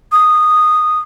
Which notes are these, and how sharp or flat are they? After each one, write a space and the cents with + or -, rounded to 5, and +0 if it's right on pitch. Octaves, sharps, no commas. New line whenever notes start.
D#6 -10